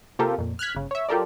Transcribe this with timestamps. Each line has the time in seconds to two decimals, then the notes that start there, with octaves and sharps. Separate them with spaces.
0.19 C3 A#3 F4 G4 A4 A#4
0.38 F2 A#2
0.59 F6 F#6 G#6 B6
0.75 G1 C#3
0.91 C#5 E5
1.09 F#3 F4 G4 A4 A#4 D5